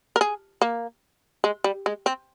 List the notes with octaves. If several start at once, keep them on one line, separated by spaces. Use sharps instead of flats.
A#4
G#4
A#3
G#3
G3
G#3
C4